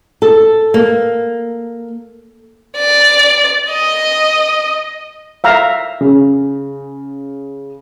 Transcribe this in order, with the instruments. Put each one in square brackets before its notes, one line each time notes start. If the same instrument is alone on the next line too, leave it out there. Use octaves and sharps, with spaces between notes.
[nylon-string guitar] A4
A#3
[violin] D5
D#5
[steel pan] E5 F5 A#5
[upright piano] C#3